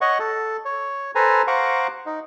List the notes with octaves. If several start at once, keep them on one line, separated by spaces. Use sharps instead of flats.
C#5 D#5 F#5 C#6
A4
C#5
A4 B4 C5 G#5 A#5
C5 F5 F#5 A#5 C#6 D6
D#4